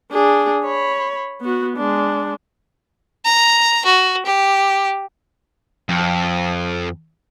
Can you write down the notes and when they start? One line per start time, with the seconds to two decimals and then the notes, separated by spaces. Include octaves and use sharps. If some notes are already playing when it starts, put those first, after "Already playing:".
0.12 D4 G#4
0.65 C#5 B5
1.41 B3 F#4
1.77 G#3 D4
3.25 A#5
3.85 F#4
4.25 G4
5.89 F2